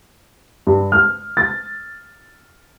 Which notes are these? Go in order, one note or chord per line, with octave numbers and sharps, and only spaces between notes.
G2
F6
A6